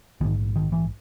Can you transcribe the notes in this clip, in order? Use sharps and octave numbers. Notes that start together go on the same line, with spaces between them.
A#1 G#2 D#3
D#3
E3